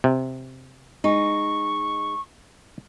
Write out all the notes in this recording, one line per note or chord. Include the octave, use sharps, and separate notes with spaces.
C3
G#3 D#4 C#6